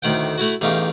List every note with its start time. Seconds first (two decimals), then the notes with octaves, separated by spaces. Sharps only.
0.02 D2 A2 D#3 F#5 G5
0.38 A3 E4 F#4
0.61 A1 E2 D#4 G4 F5 C#6